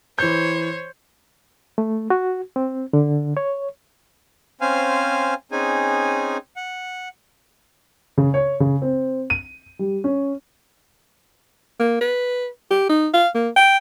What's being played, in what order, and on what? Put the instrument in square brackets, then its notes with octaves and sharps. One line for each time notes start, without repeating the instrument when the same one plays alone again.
[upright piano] E3 G6 [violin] C5 C#5
[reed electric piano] A3
F#4
C4
D3
C#5
[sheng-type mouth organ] C4 C#4 C5 F5 G#5 F6
C4 C#4 D#4 G#4 G#5
F#5
[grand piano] C#3
C#5
C#3
C4
D#7
G3
C#4
[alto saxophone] A#3
B4
G4
D#4
F5
A#3
G5